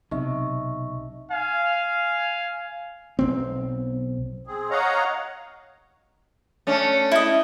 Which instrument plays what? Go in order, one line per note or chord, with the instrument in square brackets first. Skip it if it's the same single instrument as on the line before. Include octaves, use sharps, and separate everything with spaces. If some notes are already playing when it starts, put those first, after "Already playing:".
[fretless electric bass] B1 C3 [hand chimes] D#4 D#5 E5 [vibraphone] C#6
[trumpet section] F5 G#5
[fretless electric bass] B1 C4
[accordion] C4 G#4
C#5 D#5 F5 F#5 A#5
[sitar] A3 C#4 D4
[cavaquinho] E4 D#5